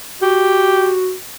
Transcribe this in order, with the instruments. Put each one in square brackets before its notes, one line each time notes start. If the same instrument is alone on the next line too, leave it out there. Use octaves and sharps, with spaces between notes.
[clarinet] F#4 [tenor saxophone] G4